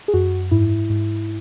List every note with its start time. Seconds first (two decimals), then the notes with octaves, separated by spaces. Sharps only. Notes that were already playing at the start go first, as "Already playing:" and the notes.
0.08 G#4
0.14 F#2 F#4
0.51 G#2 E4
0.90 G#2